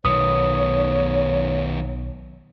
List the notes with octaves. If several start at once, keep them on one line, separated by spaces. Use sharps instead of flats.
B1 D#3 B3 C#5 D#6